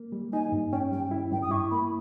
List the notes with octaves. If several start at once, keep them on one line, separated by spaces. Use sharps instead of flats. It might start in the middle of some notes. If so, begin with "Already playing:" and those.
Already playing: A#3
G3
D#4 G#5
G2
C#4 G5
G3 G5
E4
G2 G5
D#6
E4 C#6
A#3 B5